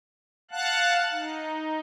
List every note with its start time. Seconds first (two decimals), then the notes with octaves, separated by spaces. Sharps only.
0.51 F5 F#5 A5 F#6
1.12 D#4